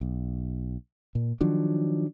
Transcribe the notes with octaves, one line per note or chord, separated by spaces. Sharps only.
B1
A#2
D#3 F3 F#3 D4